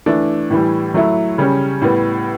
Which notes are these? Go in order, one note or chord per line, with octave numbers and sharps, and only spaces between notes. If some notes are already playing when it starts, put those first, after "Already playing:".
E3 A3 D4
A2 E3 G3
F#3 A3 E4
C#3 G3 C#4
A2 G3 B3